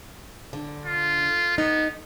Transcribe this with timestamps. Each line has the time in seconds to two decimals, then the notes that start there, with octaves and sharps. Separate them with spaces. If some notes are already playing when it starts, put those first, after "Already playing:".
0.53 D3
0.86 F4
1.58 B3 D#4